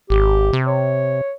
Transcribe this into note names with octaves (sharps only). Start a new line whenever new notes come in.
G#1 G4
C3
C#5